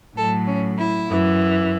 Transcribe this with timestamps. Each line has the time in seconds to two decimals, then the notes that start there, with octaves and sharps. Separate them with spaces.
0.17 A2 F#3 A4
0.48 C#4
0.78 E4
1.08 F#2 E3